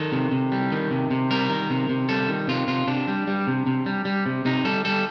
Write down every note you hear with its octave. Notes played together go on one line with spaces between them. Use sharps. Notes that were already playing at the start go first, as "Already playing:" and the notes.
Already playing: D#3 A4
C3
C3
G3
D#3
C3
C3
G3 A#4
D#3
C3
C3
G3 A4
D#3
C3 F4
C3 F4
C3 D4
G3
G3
C3
C3
G3
G3
C3
C3 D#4
G3 A4
G3 A4